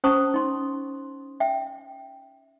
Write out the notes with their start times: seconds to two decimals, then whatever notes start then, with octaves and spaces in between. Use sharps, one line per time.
0.04 C#4 C5 A5 A#5 C#6 D#6
0.34 D#4 C6
1.40 E5 G5